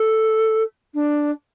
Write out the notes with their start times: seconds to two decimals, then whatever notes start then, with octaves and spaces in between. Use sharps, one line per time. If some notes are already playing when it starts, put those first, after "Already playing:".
Already playing: A4
0.94 D4